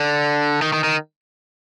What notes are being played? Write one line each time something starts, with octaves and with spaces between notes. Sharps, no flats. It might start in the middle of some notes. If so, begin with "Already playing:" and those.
Already playing: D3
D#3
D#3
D#3